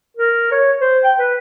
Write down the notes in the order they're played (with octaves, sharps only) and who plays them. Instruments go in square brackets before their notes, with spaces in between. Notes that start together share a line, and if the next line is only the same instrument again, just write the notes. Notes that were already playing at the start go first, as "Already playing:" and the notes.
[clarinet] A#4
C#5
C5
G5
B4